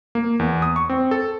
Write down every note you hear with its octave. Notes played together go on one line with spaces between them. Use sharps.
A#3
E2
D#6
C#6
C4
A4